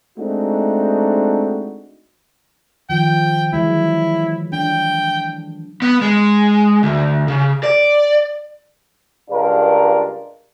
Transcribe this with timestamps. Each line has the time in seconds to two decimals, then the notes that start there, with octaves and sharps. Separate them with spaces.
0.19 G#3 A3 C4 D4 D#4 F#4
2.90 D#3 F3 G5
3.53 E3 F#3 G#3 E4
4.53 D4 G5
5.82 B3
6.01 G#3
6.83 D2
7.28 C#3
7.63 D5
9.30 C#2 G2 D4 F4 A#4